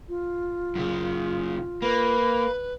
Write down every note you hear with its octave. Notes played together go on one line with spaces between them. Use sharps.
F4
F#2 C#3
A#3 B4 B5